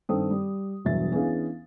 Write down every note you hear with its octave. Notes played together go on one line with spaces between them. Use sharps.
G2 D#3 C4 A4 G5 D#6
G3
E1 E2 G2 F#3 E5 A6
E3 B3 C#4 D4 G#4 F5